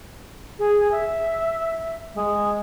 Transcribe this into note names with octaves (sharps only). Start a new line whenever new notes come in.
G#4
E5
G#3